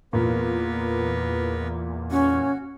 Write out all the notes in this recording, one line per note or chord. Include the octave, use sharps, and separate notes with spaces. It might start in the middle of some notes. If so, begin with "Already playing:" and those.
E2 A#2 B3 A#4 B4
C#4 F#4